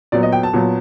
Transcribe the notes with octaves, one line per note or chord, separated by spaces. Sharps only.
A#2 F#3 B3 D5
D#5
G5
A5
A#2 F#3 B3